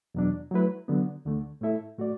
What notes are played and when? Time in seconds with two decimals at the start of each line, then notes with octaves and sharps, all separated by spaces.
0.15 E2 B2 F#3 D4
0.51 F#3 A3 E4 B4
0.88 D3 F#3 B3
1.25 D2 D3 A3
1.61 A2 A3 E4 A4 E5
1.98 A2 A3 F#4 D5